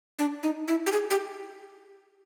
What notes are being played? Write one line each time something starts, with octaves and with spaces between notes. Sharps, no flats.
D4
D#4
E4
G4
G#4
G4